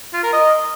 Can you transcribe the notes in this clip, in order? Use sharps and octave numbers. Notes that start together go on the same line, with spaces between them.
F4
A#4
D#5